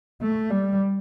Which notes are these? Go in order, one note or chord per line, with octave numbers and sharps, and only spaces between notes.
A3
G3